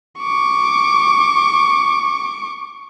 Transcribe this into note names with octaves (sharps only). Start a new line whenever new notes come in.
C#6 D6